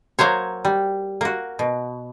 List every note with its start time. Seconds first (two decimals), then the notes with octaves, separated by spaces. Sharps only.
0.19 F#3 A#3 C5 C#5
0.65 G3
1.21 A#3 F#4
1.59 B2